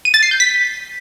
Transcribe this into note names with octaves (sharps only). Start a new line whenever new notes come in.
D#7
A6
C7
G6
B6